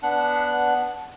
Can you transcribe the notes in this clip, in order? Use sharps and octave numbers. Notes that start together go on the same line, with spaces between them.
B3 D4 F#5